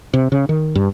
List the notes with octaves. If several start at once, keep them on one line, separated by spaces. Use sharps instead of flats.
C3
C#3
D#3
G2